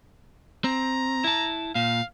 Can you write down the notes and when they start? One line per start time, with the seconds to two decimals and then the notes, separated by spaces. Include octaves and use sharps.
0.64 C4 A#5
1.24 E4 A5
1.75 A#2 F5